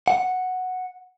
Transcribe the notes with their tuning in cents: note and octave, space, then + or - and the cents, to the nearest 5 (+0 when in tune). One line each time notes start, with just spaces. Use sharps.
F#5 -5